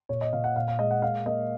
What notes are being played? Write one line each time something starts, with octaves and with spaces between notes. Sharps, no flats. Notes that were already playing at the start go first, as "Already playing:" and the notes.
A#2 C#5
D#5
A#2 F5
F#5
A#2 F5
F5
G#3 D#5
F#5
A#3 F5
A#3 D#5